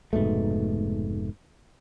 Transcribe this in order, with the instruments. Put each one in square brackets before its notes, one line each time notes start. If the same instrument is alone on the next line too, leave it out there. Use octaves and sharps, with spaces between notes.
[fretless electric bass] F1 G#2 B2 A3